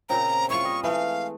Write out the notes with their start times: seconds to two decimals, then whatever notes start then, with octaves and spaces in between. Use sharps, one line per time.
0.09 A#2 C#3 C4 A#5
0.50 E4 F4 C#6
0.64 G3 D#5
0.84 E3 G#3 A3 F5